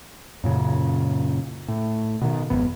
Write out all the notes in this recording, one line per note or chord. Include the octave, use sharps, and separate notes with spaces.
F#2 A#2 C#3
A2
B2 D#3
G#1 F2 B3